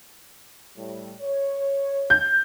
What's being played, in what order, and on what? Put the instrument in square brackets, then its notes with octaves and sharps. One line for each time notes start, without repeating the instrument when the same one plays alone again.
[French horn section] A2 G3
C#5
[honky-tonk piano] G6